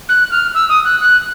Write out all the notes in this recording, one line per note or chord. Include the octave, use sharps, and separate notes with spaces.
F#6
F6
E6
D#6
F#6
F#6